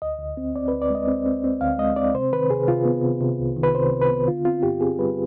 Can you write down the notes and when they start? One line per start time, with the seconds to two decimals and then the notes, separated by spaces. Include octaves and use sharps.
0.02 D2 D#5
0.19 D2
0.37 C4
0.56 C4 D5
0.68 B4
0.72 D2
0.82 D5
0.90 G#3 D#5
1.08 C4
1.26 C4
1.44 C4
1.61 D2 F5
1.79 G#3 D#5
1.96 C4 D5
2.14 C3 C5
2.33 D#3 B4
2.50 C3 G#4
2.68 C3 F4
2.85 B3
3.03 C3
3.21 C3
3.39 C2
3.56 D#3
3.63 B4
3.75 C3 C5
3.92 C3
4.01 B4
4.10 B3
4.28 D3 F4
4.45 C4 F4
4.63 G2 G4
4.81 C4 G#4
4.98 G3 B4